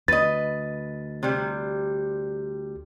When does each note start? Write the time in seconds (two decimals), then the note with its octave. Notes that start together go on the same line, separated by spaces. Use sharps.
0.08 D2 B4 D#5 A6
1.23 C3 G3